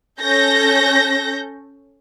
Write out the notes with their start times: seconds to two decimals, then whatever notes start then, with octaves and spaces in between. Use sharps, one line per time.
0.20 C#4 A4 G6 A#6